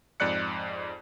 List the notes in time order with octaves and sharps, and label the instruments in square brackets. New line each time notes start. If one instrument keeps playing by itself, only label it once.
[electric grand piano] F2 G#2 D5 F#6 C#7